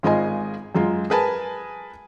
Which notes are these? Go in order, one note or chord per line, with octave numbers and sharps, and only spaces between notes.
G#1 G#3 F4 D#5 G#5
F#2 G#3 F4
G#4 A#4 B4 G#5 A5